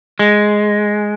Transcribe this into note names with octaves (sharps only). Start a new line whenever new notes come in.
G#3